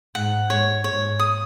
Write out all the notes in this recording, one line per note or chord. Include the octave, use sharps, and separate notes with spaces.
G#2 F#5
G#2 C#5
G#2 C#5
D#6